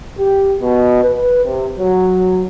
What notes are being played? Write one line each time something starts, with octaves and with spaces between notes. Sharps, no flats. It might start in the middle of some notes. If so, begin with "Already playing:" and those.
G4
B2
B4
C3
F#3